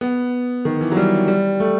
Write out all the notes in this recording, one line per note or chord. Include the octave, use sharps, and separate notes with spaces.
B3
D#3
E3
F#3
G3
G3
A3